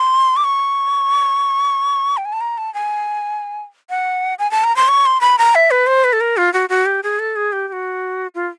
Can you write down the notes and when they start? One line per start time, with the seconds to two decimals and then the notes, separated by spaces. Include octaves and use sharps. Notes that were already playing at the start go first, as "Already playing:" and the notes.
Already playing: C6
0.37 D6
0.44 C#6
2.17 G5
2.25 G#5
2.33 A5
2.41 A#5
2.58 A5
2.74 G#5
3.90 F#5
4.39 G#5
4.51 A5
4.64 A#5
4.76 C6
4.88 C#6
5.06 C6
5.21 B5
5.39 A#5
5.55 E5
5.71 B4
5.87 C5
6.04 B4
6.13 A4
6.21 A#4
6.37 F4
6.54 F#4
6.69 F#4
6.86 G4
7.03 G#4
7.19 A4
7.36 G#4
7.52 G4
7.68 G4
7.73 F#4
8.35 F4